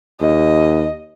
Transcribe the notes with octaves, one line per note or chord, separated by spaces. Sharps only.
D#2 D#5